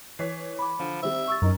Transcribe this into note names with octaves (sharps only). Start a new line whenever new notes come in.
E3 C#5 B6 C7
B5 D6
D3 F3
D#3 G3 C4 C5 E5
C#6 E6 A6
F#2 C#4 D#4 A#4